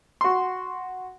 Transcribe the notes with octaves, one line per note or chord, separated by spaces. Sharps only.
F#4 C6